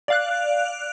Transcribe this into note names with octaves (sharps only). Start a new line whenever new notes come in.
D5 F5 F#6